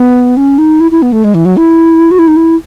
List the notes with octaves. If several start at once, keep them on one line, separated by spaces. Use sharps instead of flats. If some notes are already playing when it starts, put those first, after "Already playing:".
Already playing: B3
C#4
D#4
E4
E4
B3
A3
G#3
E3
F#3
E4
F#4
E4
D#4
E4